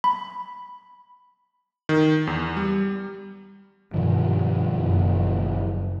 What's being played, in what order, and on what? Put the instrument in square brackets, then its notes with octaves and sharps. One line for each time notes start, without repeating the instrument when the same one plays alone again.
[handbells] B5
[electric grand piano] D#3
E2
G3
[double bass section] G2 [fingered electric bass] B2 D#3 F3
[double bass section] F#1